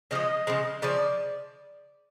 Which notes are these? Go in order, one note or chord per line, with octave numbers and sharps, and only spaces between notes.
C#3 F3 G#3 D#5
C#3 F3 G#3
C#3 F3 D5